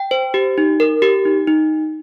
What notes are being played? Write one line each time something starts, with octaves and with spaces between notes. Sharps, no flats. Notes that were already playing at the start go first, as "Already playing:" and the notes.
Already playing: G5
C5
G4
D#4
A#4
G4
D#4
D#4